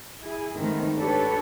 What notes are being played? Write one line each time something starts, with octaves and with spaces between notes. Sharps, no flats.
E4 G#4
D#3 F3 G#3 A3 B3 C4
D4 G4 A4 B4 C#5